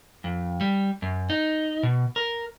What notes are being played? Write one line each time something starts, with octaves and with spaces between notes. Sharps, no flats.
F2
G3
F#2
D#4
B2
A#4